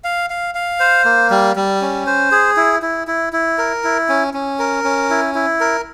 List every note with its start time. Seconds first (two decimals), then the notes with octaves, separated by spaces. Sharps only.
0.04 F5
0.30 F5
0.55 F5
0.80 C5
1.05 A#3
1.30 G3
1.56 G3
1.82 C#4
2.07 C5
2.32 G#4
2.57 E4
2.82 E4
3.07 E4
3.33 E4
3.58 A#4
3.84 E4
4.09 C#4
4.34 C#4
4.59 A#4
4.84 C#4
5.10 E4
5.35 E4
5.60 A#4